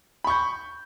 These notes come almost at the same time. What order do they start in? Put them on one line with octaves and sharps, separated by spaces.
B5 C#6 G6